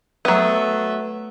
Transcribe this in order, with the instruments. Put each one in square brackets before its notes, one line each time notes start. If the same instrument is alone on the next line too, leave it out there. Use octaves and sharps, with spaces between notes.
[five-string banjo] F#3 B3 [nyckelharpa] A3 E5